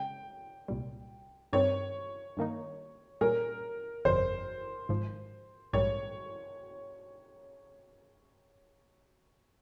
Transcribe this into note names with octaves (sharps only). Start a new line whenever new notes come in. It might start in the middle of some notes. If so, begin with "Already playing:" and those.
Already playing: C#3 G#3 G5
C2 A#2 G3
G2 D#3 G3 C4 C#5
G2 D#3 A#3 D#4
A#2 G3 C#4 G#4 A#4
G1 F2 C3 F3 C5
G#1 G#2 F3
A#1 G#2 D#3 G3 C#5